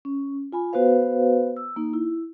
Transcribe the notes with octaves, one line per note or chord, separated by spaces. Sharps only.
C#4
F4 G#5 B5
B3 F#4 B4 C5 F5
E6
A#3 D#4
E4